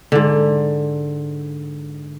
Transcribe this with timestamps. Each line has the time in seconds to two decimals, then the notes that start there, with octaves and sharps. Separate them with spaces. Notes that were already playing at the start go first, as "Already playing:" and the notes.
0.12 G#2 D3